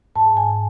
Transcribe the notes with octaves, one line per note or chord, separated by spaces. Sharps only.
G#2 A5
G#5